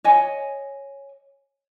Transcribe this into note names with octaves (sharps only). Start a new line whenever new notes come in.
C#5 D#5 G#5